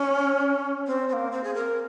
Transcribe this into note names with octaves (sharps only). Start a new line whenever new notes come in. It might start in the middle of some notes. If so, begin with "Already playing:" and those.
Already playing: C#4
C4
C4
A#3
C4
G#4
A#4